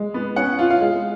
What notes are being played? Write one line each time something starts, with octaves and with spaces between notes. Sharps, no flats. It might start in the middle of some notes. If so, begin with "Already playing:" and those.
Already playing: G#3
B3
C#4 F#5
F4
F5
G#3